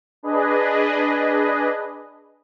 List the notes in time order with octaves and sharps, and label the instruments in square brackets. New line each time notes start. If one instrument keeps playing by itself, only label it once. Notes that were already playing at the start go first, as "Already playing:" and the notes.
[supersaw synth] D4 G#4 B4 D#5